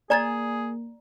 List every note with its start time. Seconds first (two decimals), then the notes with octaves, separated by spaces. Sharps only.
0.10 A#3 G#4 D5 G#5 A#5 G#6 A6